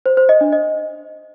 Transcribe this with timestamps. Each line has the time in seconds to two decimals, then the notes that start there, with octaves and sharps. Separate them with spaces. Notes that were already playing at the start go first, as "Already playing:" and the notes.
0.06 C5
0.17 C5
0.29 D#5
0.41 D4
0.52 D#5